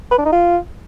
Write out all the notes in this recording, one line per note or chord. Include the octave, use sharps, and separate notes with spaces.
B4
D4
D#4
F4